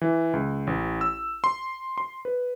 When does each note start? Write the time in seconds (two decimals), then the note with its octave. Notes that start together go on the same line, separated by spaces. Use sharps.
0.01 E3
0.33 C#2
0.67 A1
1.01 E6
1.44 C6
1.98 C6
2.25 B4